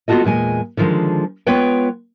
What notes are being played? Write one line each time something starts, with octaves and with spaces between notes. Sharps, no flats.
G#3 B3 F4 F#4 A4 D#5
E2 A#2 G#3 G#5
D3 D#3 F3 F#3 G#3
G#3 B3 F4 B4 C#5 G5